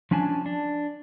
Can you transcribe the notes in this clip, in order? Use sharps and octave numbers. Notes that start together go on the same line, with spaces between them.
F3 C#4 D4 G#5 A5
D4